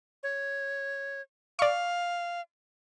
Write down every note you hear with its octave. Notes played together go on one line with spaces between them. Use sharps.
C#5
D5 F5 C#6